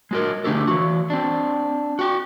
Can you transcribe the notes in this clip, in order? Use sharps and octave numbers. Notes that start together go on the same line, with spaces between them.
G#3 F#4 A#4
D3 A3 D4 G4 A4
E3 F#4
C4 D4
F#4 G5